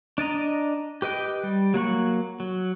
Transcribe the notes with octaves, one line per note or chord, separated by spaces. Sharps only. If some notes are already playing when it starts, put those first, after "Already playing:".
D4 D5 D#5 A#5
G4 B4 D#5 G5
G3
F#3 A#3 F#5 C#6
F#3